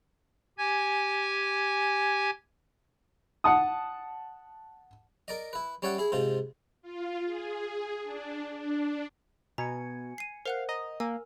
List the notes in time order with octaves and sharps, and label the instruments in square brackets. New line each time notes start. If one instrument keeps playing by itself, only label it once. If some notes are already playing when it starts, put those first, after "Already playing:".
[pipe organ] G4 G#5 G#6
[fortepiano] F#5 A5 D#6
[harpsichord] A#4 D5 D#5
E4 B4
G3 C#4 C#5 D5 E5 F#5
E4 G#4
G#2 C3 F4
[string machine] F4
G#4
D4
D4
[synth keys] B2 [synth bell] G#5 G#6 C#7 [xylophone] A#5
[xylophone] C7 D#7
[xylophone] A#4 F#5 F#6 [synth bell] C5 [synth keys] F5
[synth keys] D#5 [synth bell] A#5
[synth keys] A#3 [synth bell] A#4 [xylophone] G#5 E6